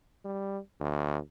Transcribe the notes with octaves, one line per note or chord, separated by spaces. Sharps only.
G3
D2